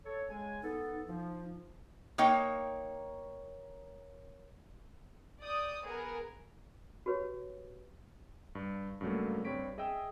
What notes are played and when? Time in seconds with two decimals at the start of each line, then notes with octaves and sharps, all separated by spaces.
0.05 A4 C#5
0.29 C#3 G#3 G#5
0.63 B3 D#4 A4
1.07 F3 D#4
2.18 A#3 D#4 C#5 G5
5.41 D5 D#6 G6
5.84 B3 G#4 A#4
7.06 F#4 G4 B4 C#5
8.55 G2
9.01 G2 C#3 F#3 A3 A#3
9.45 G2 G3 C4 C#5 B6 D7
9.78 G#4 D#5 E5 G5 E6